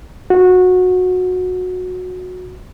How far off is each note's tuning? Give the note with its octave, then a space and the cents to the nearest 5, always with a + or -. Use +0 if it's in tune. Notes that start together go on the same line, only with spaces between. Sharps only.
F#4 -20